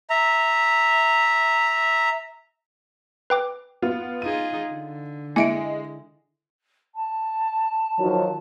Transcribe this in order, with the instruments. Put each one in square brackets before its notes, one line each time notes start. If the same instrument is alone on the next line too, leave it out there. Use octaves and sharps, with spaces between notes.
[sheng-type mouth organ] E5 A#5
[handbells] B4 G5 D6
[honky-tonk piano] B3 F4
[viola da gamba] D#4 F4 G#4 [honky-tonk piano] D#7
[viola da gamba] D3
[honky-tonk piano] G#3 [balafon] E4 E5 [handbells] G#5 C#7 D7
[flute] A5
[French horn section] D#3 F3 F#3